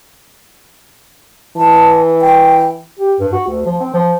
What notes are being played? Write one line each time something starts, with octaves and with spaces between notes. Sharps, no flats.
E3 A5
G5
G4
G2
F#4
D2
F3
C4
F3